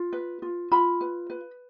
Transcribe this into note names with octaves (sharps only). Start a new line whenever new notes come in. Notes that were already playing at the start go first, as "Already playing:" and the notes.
Already playing: F4
B4
F4
F4 B5
B4
B4